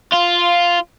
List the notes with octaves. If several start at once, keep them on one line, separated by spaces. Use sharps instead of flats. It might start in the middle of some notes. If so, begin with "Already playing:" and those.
F4